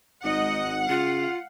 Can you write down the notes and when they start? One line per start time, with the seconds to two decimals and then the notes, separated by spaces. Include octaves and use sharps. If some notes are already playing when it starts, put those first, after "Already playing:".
0.24 G#1 G#3 D#4 D#5 F#5
0.89 C#3 F4 F5